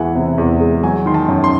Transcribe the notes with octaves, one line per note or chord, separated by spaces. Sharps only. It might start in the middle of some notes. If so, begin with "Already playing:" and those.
Already playing: E2 E3 G#3 F#5 G#5
C3
E2
G#3
F#3 G#5
D#3 C6
A5
F#2
C6